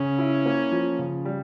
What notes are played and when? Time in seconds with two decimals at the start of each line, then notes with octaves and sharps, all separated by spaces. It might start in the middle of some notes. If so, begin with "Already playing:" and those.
Already playing: C#3 C#4
0.18 E4
0.45 A#3
0.71 F3
0.99 C#3
1.25 G3